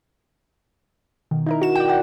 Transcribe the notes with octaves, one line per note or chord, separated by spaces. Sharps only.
B2 D#3
D#4 E4 A#4
F#4 E7
D5 G5
D5 F#5